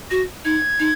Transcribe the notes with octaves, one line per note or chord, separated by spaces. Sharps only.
F#4 A#6
D#4 G#6
D#4